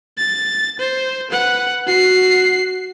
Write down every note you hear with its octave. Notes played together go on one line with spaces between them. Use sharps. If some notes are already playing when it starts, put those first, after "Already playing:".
A6
C5
B4 F#5
F#4 C7